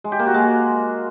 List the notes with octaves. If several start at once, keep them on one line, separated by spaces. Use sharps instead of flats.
G#3
G4
A#3
F#4
G#3